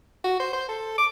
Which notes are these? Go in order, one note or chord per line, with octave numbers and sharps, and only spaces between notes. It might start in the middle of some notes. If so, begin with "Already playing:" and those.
F#4
C5
C5
A4
D6